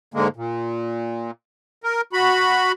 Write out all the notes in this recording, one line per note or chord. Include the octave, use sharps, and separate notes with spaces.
G#2 D3 G#3 A#3
A#2
A#4
F#4 B5